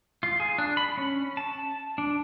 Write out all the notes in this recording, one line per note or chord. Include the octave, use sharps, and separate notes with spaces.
F4
G#4
D4
B5
C#4
A5
D4